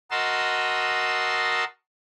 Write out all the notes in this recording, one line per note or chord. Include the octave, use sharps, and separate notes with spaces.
F#4 A#4 D#5 A5 C6 E6